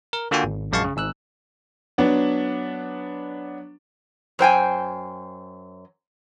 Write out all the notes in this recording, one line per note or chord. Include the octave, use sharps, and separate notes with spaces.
A#4
D3 A#3 F4 F#4 G5 G#5
G#1
A#1 F#2 G#3 F5 A5 C#6
C#3
G#1 G#2 E6 F#6
F#3 B3 D4
F#2 C5 G5 G#5